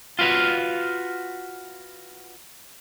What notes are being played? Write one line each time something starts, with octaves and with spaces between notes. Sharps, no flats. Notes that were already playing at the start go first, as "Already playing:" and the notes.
F4 F#4 B4 F5